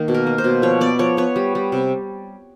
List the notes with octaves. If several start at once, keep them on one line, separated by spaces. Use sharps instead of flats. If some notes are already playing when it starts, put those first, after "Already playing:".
Already playing: D#3 A#3
B2
A#4
A#3
C5
B2
F3 C#5
B3 D5
F3 C#5
B3 C#5
G3
G3
C3